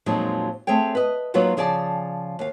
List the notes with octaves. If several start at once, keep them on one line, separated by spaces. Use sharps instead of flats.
F2 A#2 F3 F#3 G#3 D#4
A3 C4 G#4 C#5 G5
B4 D#5
F#3 A#3 B3 D#4 F4 F#4
C#3 F3 G#4 D5 E5 A5
D#2 F5